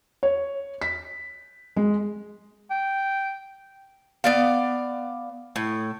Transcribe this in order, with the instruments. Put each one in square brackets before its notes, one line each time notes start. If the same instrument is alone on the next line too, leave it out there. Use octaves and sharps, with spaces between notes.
[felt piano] C#5
B6
G#3
[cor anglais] G5
[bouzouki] B3 D5 F5
A2